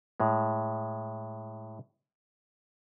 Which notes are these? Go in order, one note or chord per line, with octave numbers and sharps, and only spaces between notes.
A2 G#3